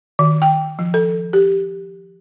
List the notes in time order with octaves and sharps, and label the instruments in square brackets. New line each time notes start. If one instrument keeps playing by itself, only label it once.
[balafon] D#3
G5
F3
A4
G4